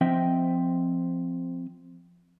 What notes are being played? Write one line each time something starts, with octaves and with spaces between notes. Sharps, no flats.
F3 C4 D#5 E5 G5